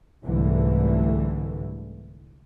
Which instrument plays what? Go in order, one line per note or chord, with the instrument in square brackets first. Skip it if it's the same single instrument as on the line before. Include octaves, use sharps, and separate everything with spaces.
[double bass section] C2 G#2 D3 E3 A3